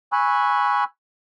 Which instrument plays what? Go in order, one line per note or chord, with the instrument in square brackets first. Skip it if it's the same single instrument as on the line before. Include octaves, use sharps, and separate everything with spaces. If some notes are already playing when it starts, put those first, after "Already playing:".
[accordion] G#5 B5 C#6 E6 F#6